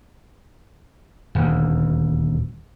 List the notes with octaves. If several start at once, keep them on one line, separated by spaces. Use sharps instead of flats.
D#1 D2